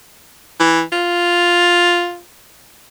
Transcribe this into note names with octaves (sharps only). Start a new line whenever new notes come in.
E3
F4